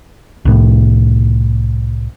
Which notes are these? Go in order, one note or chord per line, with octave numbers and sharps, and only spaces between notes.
C2 A2